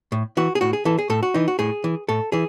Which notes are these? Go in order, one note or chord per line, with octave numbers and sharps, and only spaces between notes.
A2
E3 F#4
G#4
A2 F#4
G#4
E3 A4
G#4
A2 A4
F#4
E3 D#4
F#4
A2 G#4
E3
A2 A4
E3 G#4